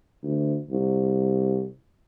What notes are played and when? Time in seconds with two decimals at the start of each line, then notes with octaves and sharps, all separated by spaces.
0.23 D2
0.70 C2